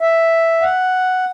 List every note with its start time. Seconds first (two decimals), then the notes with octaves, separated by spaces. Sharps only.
0.01 E5
0.62 F#5